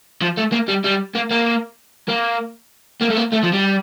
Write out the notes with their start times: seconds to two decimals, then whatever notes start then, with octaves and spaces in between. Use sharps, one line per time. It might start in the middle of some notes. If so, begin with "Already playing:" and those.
0.22 F3
0.38 A3
0.52 A#3
0.68 G3
0.84 G3
1.15 A#3
1.31 A#3
2.09 A#3
3.02 A#3
3.11 A3
3.18 A#3
3.33 A3
3.44 F3
3.54 G3